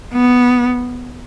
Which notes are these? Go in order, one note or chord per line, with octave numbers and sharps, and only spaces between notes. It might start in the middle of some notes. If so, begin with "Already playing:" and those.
B3